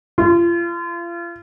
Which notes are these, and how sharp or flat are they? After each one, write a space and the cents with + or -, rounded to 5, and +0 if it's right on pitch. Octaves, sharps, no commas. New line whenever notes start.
F4 -35